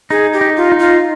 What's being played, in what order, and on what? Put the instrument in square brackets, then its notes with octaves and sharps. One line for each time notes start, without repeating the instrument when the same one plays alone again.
[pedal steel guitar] D#4 [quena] G#4
[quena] G4
[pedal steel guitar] D#4
[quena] F4
[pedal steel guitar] D#4
[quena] F4